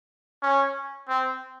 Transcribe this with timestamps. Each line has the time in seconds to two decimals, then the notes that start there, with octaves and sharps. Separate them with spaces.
0.42 C#4
1.09 C4